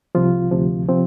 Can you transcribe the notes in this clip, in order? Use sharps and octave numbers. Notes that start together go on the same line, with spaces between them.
C2 C3 F3 F4
D2 C3 F3
C3 F3 C4